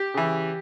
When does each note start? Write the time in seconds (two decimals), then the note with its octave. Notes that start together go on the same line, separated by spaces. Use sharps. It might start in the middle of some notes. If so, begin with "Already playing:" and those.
Already playing: G4
0.14 C#3 E3